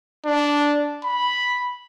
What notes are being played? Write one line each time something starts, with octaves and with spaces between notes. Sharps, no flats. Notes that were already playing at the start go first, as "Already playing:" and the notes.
D4
B5